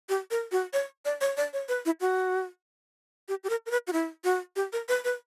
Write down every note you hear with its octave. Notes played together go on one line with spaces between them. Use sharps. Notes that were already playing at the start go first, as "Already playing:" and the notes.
G4
A#4
F#4
C#5
D5
C#5
D5
C#5
B4
E4
F#4
G4
G4
A#4
A#4
B4
F#4
E4
F#4
G4
A#4
B4
B4